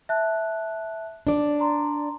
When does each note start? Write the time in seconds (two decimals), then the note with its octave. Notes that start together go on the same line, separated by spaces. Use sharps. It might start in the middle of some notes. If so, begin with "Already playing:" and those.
0.09 E5 A5 F#6
1.27 D4 D5
1.60 A#5 C6